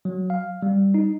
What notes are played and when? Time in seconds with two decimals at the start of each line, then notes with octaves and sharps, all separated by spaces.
0.05 F#3
0.30 F5
0.62 G3
0.94 D#4